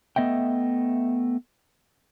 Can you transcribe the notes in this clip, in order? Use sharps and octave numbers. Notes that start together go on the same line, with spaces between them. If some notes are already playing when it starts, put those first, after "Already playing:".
A3 B3 D#5 E5 G5